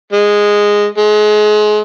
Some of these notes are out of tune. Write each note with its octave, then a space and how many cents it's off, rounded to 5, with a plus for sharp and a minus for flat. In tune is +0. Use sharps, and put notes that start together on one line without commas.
G#3 -10
G#3 +30